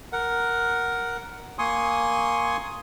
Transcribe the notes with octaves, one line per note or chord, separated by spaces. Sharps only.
A#4 F#5
A#3 G#5 C6 C#6 D#6